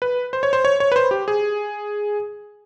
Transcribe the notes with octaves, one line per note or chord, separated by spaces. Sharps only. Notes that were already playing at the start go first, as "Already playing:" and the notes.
B4
C5
C#5
C5
C#5
C#5
B4
C5
G4
G#4